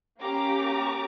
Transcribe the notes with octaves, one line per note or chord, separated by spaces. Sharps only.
A#3 C#4 G4 A#5 D6